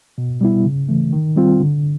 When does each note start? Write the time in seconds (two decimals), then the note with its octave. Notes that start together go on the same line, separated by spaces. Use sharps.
0.18 B2
0.41 G3 B3 E4
0.65 C#3
0.89 E3 A3
1.13 D#3
1.36 G3 C4 F4
1.60 D3